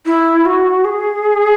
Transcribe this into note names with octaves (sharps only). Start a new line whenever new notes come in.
E4
F#4
G#4